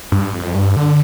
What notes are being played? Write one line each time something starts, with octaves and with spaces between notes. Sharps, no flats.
G2
F2
G2
D3